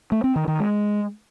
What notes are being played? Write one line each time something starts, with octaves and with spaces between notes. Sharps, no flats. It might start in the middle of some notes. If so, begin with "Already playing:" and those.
A3
C4
D#3
D#3
G#3